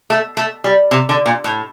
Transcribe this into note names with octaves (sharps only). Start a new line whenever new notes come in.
A3
A3
G3
C3
D3
A#2
A2